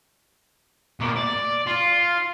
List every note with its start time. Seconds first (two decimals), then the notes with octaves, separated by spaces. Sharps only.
1.00 B2 A#3
1.16 D5
1.67 F4